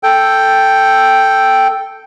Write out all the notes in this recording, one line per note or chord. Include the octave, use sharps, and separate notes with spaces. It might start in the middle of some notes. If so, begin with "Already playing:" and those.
A4 G5